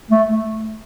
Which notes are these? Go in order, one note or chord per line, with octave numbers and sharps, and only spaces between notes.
A3